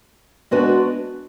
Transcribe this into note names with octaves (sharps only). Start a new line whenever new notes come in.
G#3 B3 D4 F#4 B4